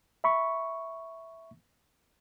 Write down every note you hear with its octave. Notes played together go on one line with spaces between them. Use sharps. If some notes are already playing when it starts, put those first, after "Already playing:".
E5 B5 C#6